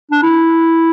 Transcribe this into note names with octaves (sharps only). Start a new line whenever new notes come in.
D4
E4